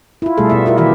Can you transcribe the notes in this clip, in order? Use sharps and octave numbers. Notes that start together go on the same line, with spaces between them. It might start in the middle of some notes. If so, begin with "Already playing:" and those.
E4 F4
B2 G3 A3 G#4 A4
B2 B3 E5
E4 F4 A#4
D#3 E3 F4 G4 E5